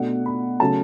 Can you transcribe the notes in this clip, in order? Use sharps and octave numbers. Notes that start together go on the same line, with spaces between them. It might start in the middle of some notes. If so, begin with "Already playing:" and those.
Already playing: B2 A3 D4 F#5
B5
C#3 F#3 A3 C#4 A5